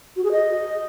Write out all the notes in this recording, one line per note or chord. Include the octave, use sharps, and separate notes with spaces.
F#4
G#4
D#5